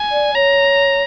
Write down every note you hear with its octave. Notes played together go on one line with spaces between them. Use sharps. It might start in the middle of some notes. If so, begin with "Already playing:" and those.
Already playing: G#5
D5
C#5 A#5